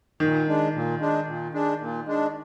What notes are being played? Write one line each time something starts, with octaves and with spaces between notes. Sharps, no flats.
A#2 D#3
G#3 D4
A#2
G#3 D4
A#2
G#3 D4
A#2
G#3 D4